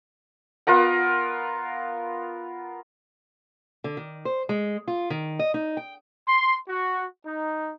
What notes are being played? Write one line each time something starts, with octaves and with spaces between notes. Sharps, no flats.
B3 F4 A#4 F#5
D3
D#3
C5
G#3
F4
D#3
D#5
D#4
G5
C6
F#4
D#4